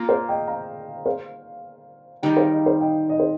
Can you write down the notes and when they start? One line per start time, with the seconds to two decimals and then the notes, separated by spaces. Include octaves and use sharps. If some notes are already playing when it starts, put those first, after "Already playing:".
Already playing: A#3 F4 A#4
0.09 C5 F5
0.29 D#5 G5
0.47 F5 A#5
1.06 C5 F5
2.23 D#3 G3 D#4 A#4 D#5 G5
2.37 C5 F5
2.52 D#5
2.66 C5
2.81 D#5 G5
3.10 D#5
3.20 C5